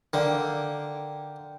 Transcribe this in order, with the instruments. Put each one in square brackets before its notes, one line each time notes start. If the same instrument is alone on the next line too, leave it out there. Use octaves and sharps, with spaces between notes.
[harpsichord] D3 A#3 [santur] G5